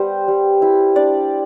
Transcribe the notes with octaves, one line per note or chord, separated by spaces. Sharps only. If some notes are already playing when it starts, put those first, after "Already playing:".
Already playing: G3 B3 C5
G3
E4
D4 D5